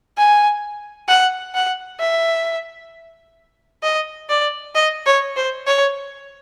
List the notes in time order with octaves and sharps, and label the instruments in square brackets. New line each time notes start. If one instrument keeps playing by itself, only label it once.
[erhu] G#5
F#5
F#5
E5
D#5
D5
D#5
C#5
C5
C#5